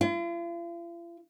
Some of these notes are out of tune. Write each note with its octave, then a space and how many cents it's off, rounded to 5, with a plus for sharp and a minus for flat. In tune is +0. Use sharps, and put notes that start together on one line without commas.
F4 -45